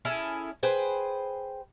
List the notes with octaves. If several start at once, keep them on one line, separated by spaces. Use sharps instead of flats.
C#4 E4 G#4 A4
G#4 B4 C5 G5